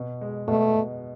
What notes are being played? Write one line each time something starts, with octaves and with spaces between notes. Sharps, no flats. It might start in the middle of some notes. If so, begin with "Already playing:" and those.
Already playing: B2
G#3
B2 A3
B2